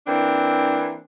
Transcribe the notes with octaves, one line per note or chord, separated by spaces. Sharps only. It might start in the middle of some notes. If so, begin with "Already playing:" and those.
E3 A#3 C4 D4